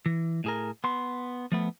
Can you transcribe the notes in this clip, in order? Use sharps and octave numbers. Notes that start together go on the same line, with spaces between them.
E3
A2 G#4 A#4
B3 C6
F3 A3 B3